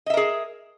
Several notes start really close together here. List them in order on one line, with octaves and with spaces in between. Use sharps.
D#5 E5 A#4 G#4